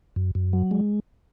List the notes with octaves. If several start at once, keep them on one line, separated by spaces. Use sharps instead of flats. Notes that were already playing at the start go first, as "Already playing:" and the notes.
F#2
F#2
F#3
G#3